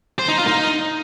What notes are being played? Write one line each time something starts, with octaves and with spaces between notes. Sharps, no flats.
C5
D#4
F4
D#4